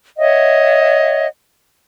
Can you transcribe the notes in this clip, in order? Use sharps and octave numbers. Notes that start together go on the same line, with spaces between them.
C#5 D#5 E5 F#5